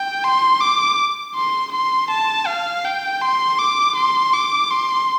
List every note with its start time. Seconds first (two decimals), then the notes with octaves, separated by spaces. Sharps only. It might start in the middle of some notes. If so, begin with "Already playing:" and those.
Already playing: G5
0.24 C6
0.61 D6
1.36 C6
1.72 C6
2.10 A5
2.47 F5
2.85 G5
3.22 C6
3.59 D6
3.96 C6
4.33 D6
4.71 C6